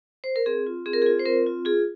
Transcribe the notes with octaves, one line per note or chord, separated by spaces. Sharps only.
C5
A#4
C4 G#4
F4
C4 G#4
A#4
G#4
F4
C5
C4 A#4
F4
F4 G#4